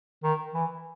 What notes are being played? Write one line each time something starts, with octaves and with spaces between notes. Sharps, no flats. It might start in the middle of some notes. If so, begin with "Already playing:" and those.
D#3
E3